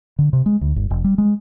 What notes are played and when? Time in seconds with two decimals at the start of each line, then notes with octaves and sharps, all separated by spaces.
0.19 D3
0.33 C3
0.46 G#3
0.61 D2
0.76 G1
0.90 F1
1.04 G3
1.18 G#3